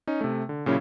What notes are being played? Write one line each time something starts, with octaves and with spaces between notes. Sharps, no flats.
C#4 D#4
C3 A3
D3
A#2 C#3 F#3 C#4 E4